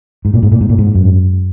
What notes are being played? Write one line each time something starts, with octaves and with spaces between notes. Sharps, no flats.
G#2
A#2
G#2
A#2
G#2
A#2
G#2
F#2